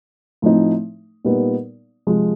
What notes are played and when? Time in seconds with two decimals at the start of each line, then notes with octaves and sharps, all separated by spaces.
0.42 A2 F3 A3 C4 D#4
1.25 A#2 G3 B3 D#4
2.07 C3 F3 G#3